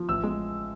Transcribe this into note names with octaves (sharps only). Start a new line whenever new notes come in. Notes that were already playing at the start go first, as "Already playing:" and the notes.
Already playing: F3
A1 E6
G#3